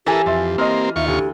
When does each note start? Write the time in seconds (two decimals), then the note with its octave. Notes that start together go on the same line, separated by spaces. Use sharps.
0.07 E3 E4 G4 A4 A#4 G#5
0.26 F2 E5 C6 A6
0.58 A#3 C4 D#5 C6 F6
0.96 D#2 F4 E5 C#6
1.08 D2 G4